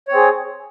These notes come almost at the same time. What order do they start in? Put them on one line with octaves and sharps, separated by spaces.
C#5 C4 G#4